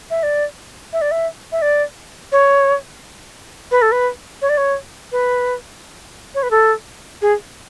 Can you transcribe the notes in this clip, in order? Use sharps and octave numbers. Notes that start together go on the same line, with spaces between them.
E5
D5
E5
D5
E5
E5
D5
C#5
B4
A4
B4
C#5
D5
C#5
B4
C#5
B4
A4
G#4